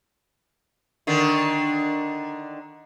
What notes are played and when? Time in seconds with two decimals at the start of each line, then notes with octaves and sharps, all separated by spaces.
1.07 D3 D#3 D4